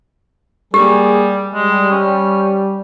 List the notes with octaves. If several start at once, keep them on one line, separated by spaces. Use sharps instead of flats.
G3 A#3 G4 G#4
G3 G#3
C#4